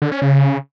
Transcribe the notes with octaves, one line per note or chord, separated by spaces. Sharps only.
D3
C#4
C#3